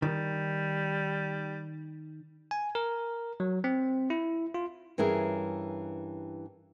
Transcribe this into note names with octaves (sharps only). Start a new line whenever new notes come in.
D#3 G3
G#5
A#4
F#3
C4
E4
F4
G2 E3 C#4 G#4 A#4